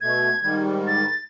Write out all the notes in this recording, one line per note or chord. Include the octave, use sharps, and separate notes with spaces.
B2 A3 G#6
G#2 D#3 G3
A6